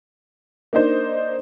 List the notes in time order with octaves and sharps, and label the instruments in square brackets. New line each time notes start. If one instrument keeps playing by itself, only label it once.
[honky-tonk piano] A#3 D4 D#4 C5